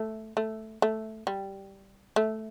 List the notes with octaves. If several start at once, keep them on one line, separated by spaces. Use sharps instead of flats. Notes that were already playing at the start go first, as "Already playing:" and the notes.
Already playing: A3
A3
A3
G3
A3